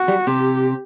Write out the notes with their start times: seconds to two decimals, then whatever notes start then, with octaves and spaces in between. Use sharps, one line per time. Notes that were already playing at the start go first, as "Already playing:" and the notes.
Already playing: F#4
0.08 G3
0.27 C3 G4